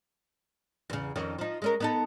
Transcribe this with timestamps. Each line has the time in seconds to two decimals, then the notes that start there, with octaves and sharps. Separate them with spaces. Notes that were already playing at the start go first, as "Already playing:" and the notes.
0.90 E2 C#3
1.16 F2 D#3 C#4
1.38 F3 D#4
1.62 G#3 C#4 A#4
1.80 B3 D#4 A4